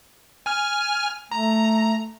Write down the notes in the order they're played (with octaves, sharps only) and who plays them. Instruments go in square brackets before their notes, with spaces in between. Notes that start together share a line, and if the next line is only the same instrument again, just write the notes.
[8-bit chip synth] G#5 F6
[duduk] A3 [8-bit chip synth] A#5